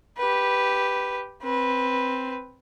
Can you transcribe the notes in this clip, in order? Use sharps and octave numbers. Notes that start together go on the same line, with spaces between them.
G4 B4
C4 B4